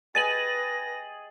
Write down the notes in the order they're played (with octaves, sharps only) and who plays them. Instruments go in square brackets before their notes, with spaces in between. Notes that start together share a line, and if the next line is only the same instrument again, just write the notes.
[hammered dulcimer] G#4 D#5 G5 [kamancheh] B4 [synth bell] A6 D#7 F#7 [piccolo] A#6